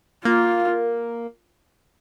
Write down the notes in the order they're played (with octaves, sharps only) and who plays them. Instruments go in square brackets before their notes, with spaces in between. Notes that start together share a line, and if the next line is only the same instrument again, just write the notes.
[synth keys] A#3 [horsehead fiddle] F4